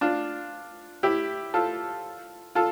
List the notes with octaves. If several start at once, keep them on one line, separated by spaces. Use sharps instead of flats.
D4 F4
E4 G4
F4 A4
F4 A4